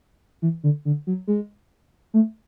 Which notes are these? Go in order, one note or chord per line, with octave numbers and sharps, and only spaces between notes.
E3
D3
D3
F#3
G#3
A3